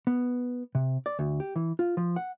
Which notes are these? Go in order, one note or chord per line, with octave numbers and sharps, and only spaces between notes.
B3
C3
D5
D2
G4
E3
F4
F3
F#5